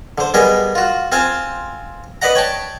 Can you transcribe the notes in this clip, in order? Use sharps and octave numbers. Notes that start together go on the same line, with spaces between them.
D3 C5
G3 B3 G#4 A#4 D#5
F4 F#4
C4 F4 C5 F5 G#5
B4 D5 D#5 F#5 A#5
C#5 G5 A5